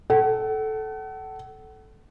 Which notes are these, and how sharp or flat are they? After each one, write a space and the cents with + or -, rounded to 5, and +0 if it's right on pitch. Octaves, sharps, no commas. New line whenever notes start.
A4 -10 F#5 +35